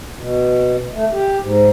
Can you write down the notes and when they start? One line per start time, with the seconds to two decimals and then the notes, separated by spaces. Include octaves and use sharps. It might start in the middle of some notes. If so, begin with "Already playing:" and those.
0.19 B2
0.93 A3
1.13 G4
1.42 G#2